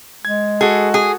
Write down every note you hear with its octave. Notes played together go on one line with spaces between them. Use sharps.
G#3 G#6
F#4 G#4 A4
G#4